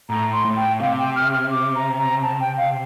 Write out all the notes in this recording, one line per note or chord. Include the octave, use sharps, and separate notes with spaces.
A2 A#5
C6
A2
G5
C3 F5
G5
F6
F6
D6
A#5
A#5
A5
G5
F5